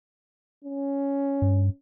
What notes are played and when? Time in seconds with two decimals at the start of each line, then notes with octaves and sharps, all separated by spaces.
0.64 C#4
1.42 G2